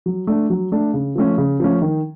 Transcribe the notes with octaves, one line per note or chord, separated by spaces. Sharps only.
F#3
A3 D4
F#3
A3 D4
C#3
F3 A3 C#4
C#3
F3 A3 C#4
D#3